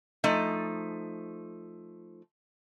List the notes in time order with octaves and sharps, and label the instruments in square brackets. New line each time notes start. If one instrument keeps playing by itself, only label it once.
[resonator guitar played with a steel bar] F3 A3 D#4